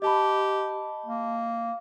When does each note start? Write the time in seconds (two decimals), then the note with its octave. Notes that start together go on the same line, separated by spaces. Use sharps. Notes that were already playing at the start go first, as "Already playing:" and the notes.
0.02 G4 D#5 A5 B5
1.06 A#3